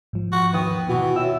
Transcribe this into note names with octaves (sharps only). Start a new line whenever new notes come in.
G#2 F3
F#4
D#2 B3 G5 D#6
B2 E3 F#4
F4 F#4 C#5 E5 G5 E6